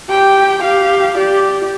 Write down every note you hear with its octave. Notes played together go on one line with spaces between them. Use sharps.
G4 G5
G4 F5
G4 D5